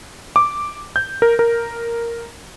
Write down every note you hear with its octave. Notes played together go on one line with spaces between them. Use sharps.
D6
G6
A#4
A#4